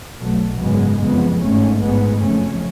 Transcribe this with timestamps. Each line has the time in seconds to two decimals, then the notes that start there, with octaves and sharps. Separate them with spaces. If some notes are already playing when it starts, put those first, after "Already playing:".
0.19 B1 B2 F#3 A3
0.60 G#1 F#2 C#3 G#3 B3
1.00 F#1 F2 C#3 G#3 B3
1.40 G#1 G#2 A3 C#4
1.81 A1 G#2 G#3 B3
2.20 F#1 F2 C#3 A3 C#4